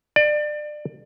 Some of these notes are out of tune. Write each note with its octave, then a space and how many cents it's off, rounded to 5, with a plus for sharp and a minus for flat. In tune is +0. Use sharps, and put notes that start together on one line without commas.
D5 +30